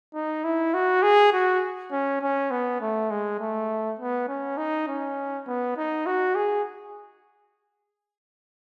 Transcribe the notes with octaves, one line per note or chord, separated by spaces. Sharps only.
D#4
E4
F#4
G#4
F#4
C#4
C#4
B3
A3
G#3
A3
B3
C#4
D#4
C#4
B3
D#4
F#4
G#4